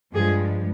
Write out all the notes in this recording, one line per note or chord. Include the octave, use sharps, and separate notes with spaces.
G2 F3 G#3 G#4